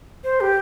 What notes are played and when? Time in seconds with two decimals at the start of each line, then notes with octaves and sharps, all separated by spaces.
0.24 C5
0.41 G4